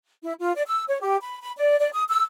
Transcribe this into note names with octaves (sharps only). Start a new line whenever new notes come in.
E4
F4
D5
E6
C#5
G4
B5
B5
D5
D5
D#6
E6